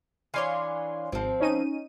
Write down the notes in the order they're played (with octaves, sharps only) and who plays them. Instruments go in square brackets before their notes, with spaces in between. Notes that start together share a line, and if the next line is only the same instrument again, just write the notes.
[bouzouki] E3 D4 C#5 [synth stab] F5 G#5 C6
[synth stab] G#1 [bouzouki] F3 C4
[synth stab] C#4 D#4 D#7